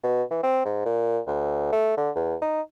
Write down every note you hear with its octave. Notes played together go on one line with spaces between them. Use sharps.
B2
E3
C4
G#2
A#2
D2
A3
D3
E2
D#4